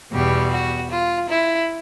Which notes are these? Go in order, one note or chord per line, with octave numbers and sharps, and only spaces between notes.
E2 B2 G3 G4
F#4
F4
E4